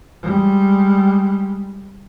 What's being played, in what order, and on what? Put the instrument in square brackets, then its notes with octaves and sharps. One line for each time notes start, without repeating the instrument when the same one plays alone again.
[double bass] G3 G#3